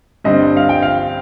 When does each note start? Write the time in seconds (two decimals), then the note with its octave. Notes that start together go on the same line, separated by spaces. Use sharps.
0.24 G2 D3 G3 C4 D#5
0.57 F5
0.69 G5
0.82 F5